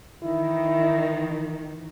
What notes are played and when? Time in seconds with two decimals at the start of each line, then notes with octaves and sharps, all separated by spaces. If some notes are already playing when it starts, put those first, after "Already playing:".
0.23 D#3 E3 E4